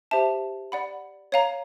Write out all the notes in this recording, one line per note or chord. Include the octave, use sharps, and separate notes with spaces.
G4 C5 E5 A5
D5 F#5 B5
C#5 F5 A#5